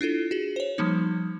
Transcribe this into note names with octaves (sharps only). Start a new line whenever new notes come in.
D4 E4 F4 A4
F#4 G#4
C5 C#5
F3 G3 A#3 D#4